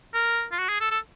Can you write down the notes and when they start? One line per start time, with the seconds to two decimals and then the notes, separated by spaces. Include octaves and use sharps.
0.14 A#4
0.52 F4
0.58 F#4
0.69 G#4
0.81 A4
0.91 A4